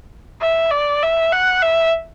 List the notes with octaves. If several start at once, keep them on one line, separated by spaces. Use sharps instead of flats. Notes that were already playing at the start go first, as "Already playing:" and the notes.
E5
D5
E5
F#5
E5